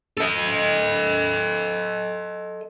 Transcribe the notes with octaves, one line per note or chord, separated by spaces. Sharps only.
A4 D#5